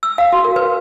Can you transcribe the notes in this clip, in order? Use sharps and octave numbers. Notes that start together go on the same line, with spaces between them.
E6
F5
F#4
A#4
B4